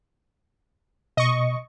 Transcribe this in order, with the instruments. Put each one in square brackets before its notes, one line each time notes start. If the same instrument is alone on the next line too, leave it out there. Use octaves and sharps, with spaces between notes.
[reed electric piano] B2 [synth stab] D#5 C#6